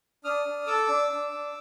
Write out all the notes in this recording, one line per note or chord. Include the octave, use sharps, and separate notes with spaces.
D4 D#6 F6
D4
A4 D6 E6
D4
D4
D4